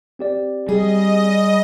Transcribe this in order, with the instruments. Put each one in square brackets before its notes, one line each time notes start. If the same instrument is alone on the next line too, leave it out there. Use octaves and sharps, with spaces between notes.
[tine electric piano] C4 G4 D5
[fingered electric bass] G3 [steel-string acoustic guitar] G#4 [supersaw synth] D#5